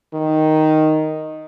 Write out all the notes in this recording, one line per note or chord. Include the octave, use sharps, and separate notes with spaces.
D#3